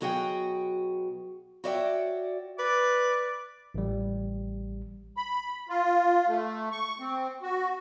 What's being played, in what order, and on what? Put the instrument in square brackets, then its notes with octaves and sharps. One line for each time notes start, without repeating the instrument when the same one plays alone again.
[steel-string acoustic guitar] B2 F#3 F#4 G#4 F#5 G5
F#4 C#5 D5 E5 F#5 G5
[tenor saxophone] B4 [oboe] D5
[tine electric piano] A1 G3
[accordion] B5
F4
A3
C#6
C4
F#4